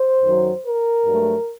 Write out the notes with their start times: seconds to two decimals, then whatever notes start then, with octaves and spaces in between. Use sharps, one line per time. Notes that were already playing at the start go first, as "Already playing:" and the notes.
Already playing: C5
0.21 F#2 D#3 F#3
0.63 A#4
1.06 G2 F#3 A3